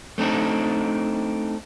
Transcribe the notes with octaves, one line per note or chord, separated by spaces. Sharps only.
A3 C4 D4 D#4